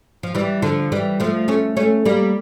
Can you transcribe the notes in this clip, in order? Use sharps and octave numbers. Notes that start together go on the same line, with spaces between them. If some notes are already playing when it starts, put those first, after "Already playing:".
F3
E3 G3
D3 F3
E3 G3
F3 A3
A3 C#4
A3 C#4
G3 A#3